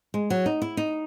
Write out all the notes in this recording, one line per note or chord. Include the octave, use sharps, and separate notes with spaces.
G#3
F#3
D#4
E4
D#4